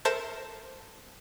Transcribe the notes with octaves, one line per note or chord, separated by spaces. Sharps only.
A4 A#4 C5 E5 A5 G6